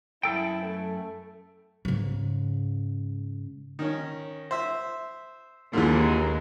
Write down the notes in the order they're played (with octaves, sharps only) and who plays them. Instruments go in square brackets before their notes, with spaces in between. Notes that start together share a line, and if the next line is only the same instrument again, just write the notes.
[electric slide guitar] F#2 A4 G5 [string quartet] E4
[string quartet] A3
[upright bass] G#2 C#3
[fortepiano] D#3 C#4
C5 E5
[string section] D#2 G#3 [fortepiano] A#2 D3 E3